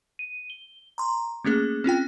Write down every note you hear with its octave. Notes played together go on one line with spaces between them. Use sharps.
D#7
G7
A#5 C6
A3 A#3 C#4 G#4
C4 C#4 F4 G5